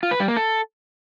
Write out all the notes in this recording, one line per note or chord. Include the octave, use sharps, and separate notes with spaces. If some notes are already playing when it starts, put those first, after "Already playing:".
F4
B4
G3
A#3
A4